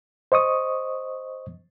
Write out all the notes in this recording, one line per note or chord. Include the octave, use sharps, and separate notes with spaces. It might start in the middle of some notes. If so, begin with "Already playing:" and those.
C5 D#5 C#6 D#6